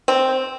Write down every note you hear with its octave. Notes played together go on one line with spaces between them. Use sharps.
C4